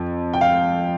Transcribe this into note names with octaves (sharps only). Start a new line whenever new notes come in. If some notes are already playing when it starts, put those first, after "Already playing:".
Already playing: F2
G5
F5